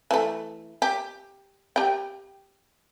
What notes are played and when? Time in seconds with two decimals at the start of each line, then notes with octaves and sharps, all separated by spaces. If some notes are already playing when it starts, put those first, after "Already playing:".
0.11 E3 A3
0.82 G4
1.76 G4 G5